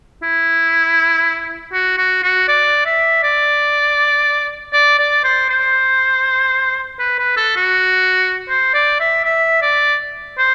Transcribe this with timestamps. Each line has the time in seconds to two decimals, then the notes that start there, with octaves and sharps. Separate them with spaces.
0.23 E4
1.73 F#4
1.98 F#4
2.23 F#4
2.48 D5
2.86 E5
3.23 D5
4.73 D5
4.99 D5
5.24 C5
5.49 C5
6.99 B4
7.18 B4
7.37 A4
7.56 F#4
8.49 C5
8.74 D5
9.00 E5
9.25 E5
9.62 D5
10.38 C5